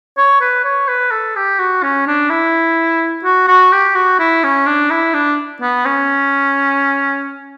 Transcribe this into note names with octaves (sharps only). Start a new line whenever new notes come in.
C#5
B4
C#5
B4
A4
G4
F#4
C#4
D4
E4
F#4
F#4
G4
F#4
E4
C#4
D4
E4
D4
B3
C#4